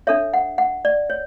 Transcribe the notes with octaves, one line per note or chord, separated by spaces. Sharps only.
D4 A4 C#5 E5
F#5
F#5
D5
C#5